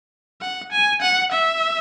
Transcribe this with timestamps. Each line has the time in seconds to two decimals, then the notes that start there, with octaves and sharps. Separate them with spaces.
0.41 F#5
0.72 G#5
1.02 F#5
1.32 E5